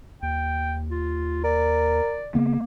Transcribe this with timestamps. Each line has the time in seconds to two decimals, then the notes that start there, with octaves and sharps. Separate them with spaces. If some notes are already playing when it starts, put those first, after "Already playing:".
0.22 D#2 G5
0.91 F4
1.44 A#4 D5
2.35 C#3 A#3 B3